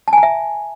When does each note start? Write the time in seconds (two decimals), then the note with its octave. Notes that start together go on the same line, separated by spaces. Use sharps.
0.08 A5
0.13 G#5
0.18 A#5
0.23 E5